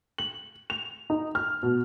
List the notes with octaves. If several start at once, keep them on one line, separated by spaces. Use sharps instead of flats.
F#7
F7
D#4
F6
B2